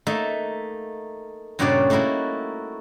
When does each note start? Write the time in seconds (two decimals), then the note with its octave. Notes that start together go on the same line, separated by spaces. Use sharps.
0.07 A3 A#3 D#4 E5
1.59 G2 A#2 C#3 F#4 C#5 D5
1.90 A3 A#3 D#4 E4 F#4